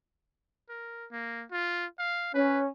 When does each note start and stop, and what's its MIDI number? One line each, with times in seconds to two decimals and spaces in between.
0.69 1.06 70
1.12 1.44 58
1.51 1.86 65
1.99 2.31 77
2.34 2.67 61
2.34 2.60 71